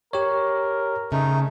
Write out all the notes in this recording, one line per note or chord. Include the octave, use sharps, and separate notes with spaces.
G4 A#4 C#5
C#3 A3 D#4